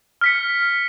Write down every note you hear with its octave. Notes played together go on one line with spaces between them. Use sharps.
F6 B6 C#7